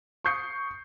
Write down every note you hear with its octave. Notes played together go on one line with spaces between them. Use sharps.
C#6 D#6 G6 C7 C#7